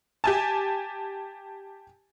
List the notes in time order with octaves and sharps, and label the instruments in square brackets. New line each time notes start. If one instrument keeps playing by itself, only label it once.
[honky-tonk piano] G4 G#5 A5